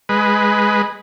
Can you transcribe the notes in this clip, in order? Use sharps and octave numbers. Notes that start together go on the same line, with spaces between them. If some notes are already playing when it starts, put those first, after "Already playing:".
G#3 B4